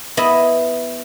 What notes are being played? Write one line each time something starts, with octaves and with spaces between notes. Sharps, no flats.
B3 E4 D#5